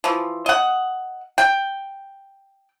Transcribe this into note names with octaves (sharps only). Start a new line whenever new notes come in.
E3 F3
D#5 F#5
G5